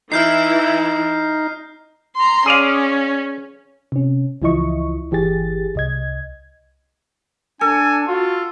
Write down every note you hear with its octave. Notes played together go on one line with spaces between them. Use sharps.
E3 D#4 E4 F6 G6 C7
A#5 C6
C#4 G#4 D5 F5
C3 C#4
C#2 E3 F3 E4 D#5 C#6
G1 E3 G4 G#4 A6
C2 D#5 G#6
D4 A4 G#5
F4 F#4